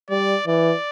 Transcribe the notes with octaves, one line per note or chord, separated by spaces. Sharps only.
G3 D5
E3 D5